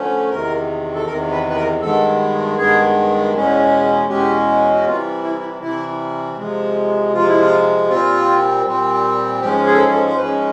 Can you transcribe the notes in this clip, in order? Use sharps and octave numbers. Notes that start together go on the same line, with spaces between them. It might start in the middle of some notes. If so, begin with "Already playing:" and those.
Already playing: D3 F3 A3 C#4
E2 C3 D#3 A#4
A4
E2 C3 D#3 A#4
B4
B4
A#4
G2 D#3 G#3 B3 A4
G2 D#3 G#3 B3 G#4
E2 B2 G#3 C#4
E2 B2 G#3 C#4 G4
F#4
C3 E3 G3 F4
E4
E4
C3 E3 G3 E4
C3 F3 G#3
C3 F3 G#3 F4
E4
F4
A#2 G3 C4 F4
A#2 G3 C4
G#2 F3 G#3 C#4 G4
G#4
A4
G#4
A4
C5
G#2 F3 G#3 C#4 B4